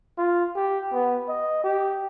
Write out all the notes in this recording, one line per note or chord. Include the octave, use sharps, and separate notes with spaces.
F4
G4
B3
D#5
G4